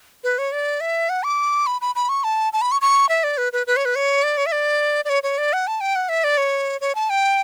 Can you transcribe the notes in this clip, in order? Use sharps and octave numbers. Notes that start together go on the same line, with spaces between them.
B4
C#5
D5
E5
F#5
D6
B5
B5
B5
C#6
A5
A5
B5
C#6
C#6
E5
D5
B4
B4
B4
C#5
B4
C#5
D5
C#5
E5
D5
D5
C#5
C#5
D5
F#5
A5
G5
F#5
E5
D5
C#5
C#5
A5
G5